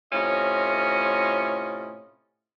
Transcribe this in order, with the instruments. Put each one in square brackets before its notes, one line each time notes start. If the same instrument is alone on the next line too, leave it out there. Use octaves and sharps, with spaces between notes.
[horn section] A2 C3 C#4 F4 D#5